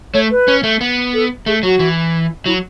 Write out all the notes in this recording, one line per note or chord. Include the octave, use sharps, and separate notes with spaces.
A3 C#5
B4
C#4
A3
B3
A4
A3 G#4
F#3 F#4
E3
F#3 E4